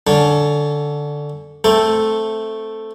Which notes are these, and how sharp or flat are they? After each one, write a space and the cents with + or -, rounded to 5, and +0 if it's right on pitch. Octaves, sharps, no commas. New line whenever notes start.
D3 +0 C#4 +20 A5 +0
A3 +0 C4 +0 A4 +0